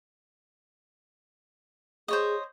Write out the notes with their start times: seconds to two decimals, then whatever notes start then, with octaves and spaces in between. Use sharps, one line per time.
2.08 G#4 C5 C#5 D#5